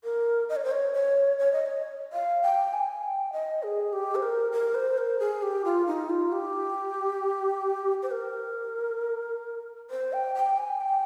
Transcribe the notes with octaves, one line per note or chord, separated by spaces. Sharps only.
A#4
D#5
C#5
C5
C#5
C#5
C#5
D#5
C#5
F5
G5
G#5
G5
D#5
G#4
G4
C5
A#4
A#4
C5
A#4
G#4
G4
F4
D#4
F4
G4
C5
A#4
C5
G5
G5
G#5
G5